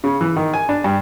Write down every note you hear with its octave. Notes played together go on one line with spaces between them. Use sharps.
C#3
E3
D#3
G#5
D4
G2